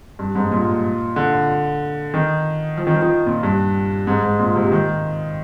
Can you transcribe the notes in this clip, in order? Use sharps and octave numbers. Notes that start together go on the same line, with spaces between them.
G2
G#2
G#2
A#2
D3
D#3
F3
D#3
F3
D#3
A#2
G2
G#2
G#2
A#2
C3
D#3